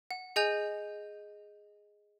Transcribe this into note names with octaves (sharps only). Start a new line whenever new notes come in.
F#5
G#4 D#5 G#5 G6 F7